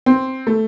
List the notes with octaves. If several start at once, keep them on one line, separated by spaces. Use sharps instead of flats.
C4
A3